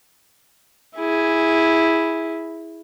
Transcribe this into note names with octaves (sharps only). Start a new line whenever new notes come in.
E4 G#4